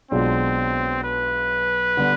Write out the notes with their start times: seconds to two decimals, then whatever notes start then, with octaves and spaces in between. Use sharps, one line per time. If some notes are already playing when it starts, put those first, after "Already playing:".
0.11 B1 B2 G#3 C4 D4 F4
1.04 B4
1.97 D3 G3 B3 D4